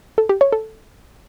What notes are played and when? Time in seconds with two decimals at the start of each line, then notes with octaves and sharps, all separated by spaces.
0.18 A4
0.29 G4
0.41 C#5
0.52 A4